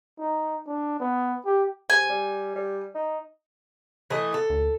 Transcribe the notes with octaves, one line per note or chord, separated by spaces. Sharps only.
D#4
D4
B3
G4
C3 G#5
G3
G3
D#4
E3 A3 D#5
A4
D2